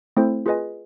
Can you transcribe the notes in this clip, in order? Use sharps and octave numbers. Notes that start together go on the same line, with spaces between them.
A3 C4 E4 A4 C5
F4 G#4 B4 D#5 G#5